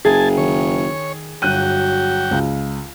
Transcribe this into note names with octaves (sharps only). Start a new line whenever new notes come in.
F#1 G#4 G#5 A5
D#3 C#5
G1 F#3 F#4 G5 F#6 D#7
C#2